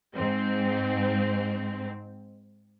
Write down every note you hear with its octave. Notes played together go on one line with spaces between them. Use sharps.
G#2 C4